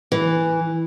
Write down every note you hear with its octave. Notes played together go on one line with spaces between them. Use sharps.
E3